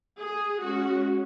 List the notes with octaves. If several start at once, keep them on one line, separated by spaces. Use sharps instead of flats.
G#4
G#3 C#4 F#4